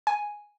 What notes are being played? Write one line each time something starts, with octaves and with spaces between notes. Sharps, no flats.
G#5